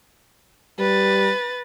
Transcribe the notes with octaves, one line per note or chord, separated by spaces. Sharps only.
G3 B4 A6